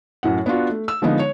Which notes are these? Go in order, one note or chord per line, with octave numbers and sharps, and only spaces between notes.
F#2 A2 F#5
B3 D4 F4 F#4
A3
E6
D3 F3 G#3 B3 D#4
C#5